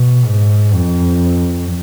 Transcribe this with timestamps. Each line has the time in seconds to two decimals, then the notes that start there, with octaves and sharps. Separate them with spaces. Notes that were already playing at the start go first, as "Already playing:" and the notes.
Already playing: B2
0.25 G#2
0.74 F2